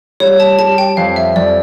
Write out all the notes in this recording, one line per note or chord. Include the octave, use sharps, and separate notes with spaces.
G3 C#5
A5
G3 A5
G5
F2 F5
E5
F2 D5